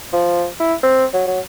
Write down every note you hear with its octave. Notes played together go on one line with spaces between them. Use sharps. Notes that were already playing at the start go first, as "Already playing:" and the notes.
F3
E4
C4
F#3
F#3